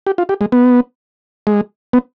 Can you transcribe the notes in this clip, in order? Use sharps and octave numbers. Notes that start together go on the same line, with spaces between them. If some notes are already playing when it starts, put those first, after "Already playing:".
G4
F4
G4
G#3
B3
G#3
B3